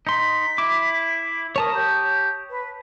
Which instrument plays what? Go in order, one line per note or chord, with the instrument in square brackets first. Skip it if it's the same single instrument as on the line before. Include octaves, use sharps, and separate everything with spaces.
[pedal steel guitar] D#4 C6 [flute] B6
[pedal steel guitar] E4 D6
[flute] A#4 [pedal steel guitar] C#5 A5 D#6
[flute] G4
B4